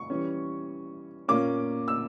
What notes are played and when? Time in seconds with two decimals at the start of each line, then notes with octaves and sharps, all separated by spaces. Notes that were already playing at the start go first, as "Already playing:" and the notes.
Already playing: C#6
0.10 E3 G3 C#4
1.28 A#2 A#3 C#4 D6
1.88 E6